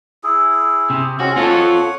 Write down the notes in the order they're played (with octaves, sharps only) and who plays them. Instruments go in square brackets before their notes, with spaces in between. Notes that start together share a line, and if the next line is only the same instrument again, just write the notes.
[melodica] E4 G#4
[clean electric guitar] C3
[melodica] G#3 C4 C#4 [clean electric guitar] F#4
[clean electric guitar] C4 F4 A4 [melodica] C#5 F#5